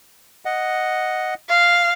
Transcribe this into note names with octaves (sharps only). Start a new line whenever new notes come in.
D#5 F#5
F5